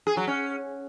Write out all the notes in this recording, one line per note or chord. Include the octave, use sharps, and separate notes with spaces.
G#4
F#3
C#4